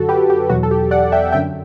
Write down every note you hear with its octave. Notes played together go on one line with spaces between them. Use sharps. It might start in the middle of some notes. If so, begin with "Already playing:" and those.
Already playing: F#2 D3 F#3 F#4 A4
G4 B4
G4
E2 B2 F#3 F#4
A4
G4
D5 F#5
E5 G5
F#2 D3 F#3 E5 G5